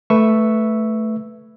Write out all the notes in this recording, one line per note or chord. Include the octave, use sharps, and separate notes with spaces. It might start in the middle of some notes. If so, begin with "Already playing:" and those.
A3 B4 E5 C#6 E6